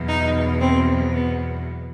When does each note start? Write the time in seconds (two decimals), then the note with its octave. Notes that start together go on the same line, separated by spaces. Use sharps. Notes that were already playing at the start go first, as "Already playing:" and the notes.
Already playing: E2 B2 F#3
0.08 D#4
0.60 C4
1.13 B3